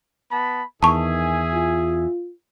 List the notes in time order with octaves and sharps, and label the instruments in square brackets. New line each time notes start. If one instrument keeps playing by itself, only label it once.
[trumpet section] B3 A5 B5
[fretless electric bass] E2 [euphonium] D#3 [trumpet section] G#4 E5 G#5 [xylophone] A5 C#6
[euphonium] F4